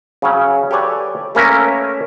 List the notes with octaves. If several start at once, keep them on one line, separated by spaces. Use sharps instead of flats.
C#3 F#3 C#4
G4 A4 B4 C#5 D5 G#5
A3 A#3 C#4 A#4 B4 E5